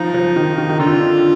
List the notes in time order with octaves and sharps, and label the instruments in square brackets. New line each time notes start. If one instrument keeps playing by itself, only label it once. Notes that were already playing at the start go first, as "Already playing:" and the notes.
Already playing: [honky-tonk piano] F3 [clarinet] D#4
[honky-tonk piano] F3
D#3
D#3
D#3
[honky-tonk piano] D3 [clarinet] F4